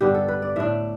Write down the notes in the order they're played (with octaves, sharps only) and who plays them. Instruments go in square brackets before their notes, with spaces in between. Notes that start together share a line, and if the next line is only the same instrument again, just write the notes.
[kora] G2 D3 B3 D4 G4
A4
B4
D5
A2 A3 D4 E5